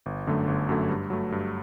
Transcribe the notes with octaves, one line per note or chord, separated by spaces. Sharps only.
G1
F#2 D3 F#3 A3
G1
F#2 D3 F#3 A3
G2
F#3 A3
G2